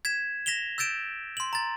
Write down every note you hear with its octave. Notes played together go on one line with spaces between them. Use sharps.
G#6 B6 E7
A#6 B6 E7 F7 G7
E6 G6 A6 D7 E7
C6 F#7
A#5 A6